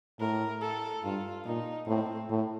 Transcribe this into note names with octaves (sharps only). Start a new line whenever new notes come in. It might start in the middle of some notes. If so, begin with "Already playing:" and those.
A2 A#4
A4
G2 F4
A#2 D#4
A2 C4
A2